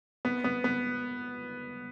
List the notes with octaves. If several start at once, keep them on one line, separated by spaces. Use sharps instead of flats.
B3
B3
B3